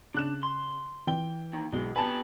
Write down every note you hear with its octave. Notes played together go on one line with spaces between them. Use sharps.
C#3 D4 F#6 E7
C6
E3 G5 G7
D#2 D#3
B1 E3 G#3
B3 G4 B4 G#5 A5